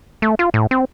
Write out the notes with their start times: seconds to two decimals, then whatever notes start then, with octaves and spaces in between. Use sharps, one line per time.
0.22 A3
0.39 F4
0.54 A2
0.71 C4